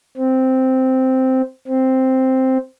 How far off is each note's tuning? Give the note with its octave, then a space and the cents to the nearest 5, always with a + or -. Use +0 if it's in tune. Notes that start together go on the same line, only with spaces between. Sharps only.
C4 -5
C4 +0